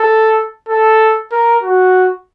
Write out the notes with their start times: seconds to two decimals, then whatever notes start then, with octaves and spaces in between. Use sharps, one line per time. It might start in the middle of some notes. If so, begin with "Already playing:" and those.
Already playing: A4
0.69 A4
1.32 A#4
1.63 F#4